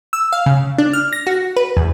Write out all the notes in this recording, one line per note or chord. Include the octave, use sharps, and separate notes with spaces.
E6
F5
C#3
D4
F6
A#6
F#4
B4
E2